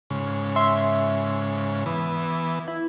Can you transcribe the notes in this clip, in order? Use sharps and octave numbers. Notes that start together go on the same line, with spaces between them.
G#2 C#3
E5 C6
E3 B3
E4